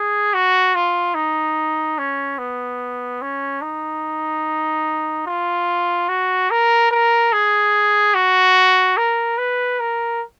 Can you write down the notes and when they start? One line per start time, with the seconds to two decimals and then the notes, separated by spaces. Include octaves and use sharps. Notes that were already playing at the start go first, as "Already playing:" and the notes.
Already playing: G#4
0.34 F#4
0.75 F4
1.15 D#4
1.98 C#4
2.38 B3
3.22 C#4
3.62 D#4
5.27 F4
6.09 F#4
6.51 A#4
6.91 A#4
7.33 G#4
8.15 F#4
8.97 A#4
9.38 B4
9.80 A#4